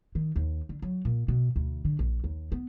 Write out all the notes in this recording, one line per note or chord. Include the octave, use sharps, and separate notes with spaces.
D#3
D#2
D3
F#3
A#2
B2
D2
D3
A#1
D#2
B3